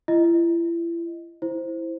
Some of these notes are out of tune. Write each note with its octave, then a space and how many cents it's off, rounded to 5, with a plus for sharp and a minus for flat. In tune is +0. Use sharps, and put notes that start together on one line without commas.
E4 +40 D#5 +0
E4 +0 C5 +0